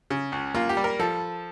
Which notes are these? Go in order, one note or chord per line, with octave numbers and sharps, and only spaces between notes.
C#3
C#2
A#3 F4
G4
G3
A#4
F3 A4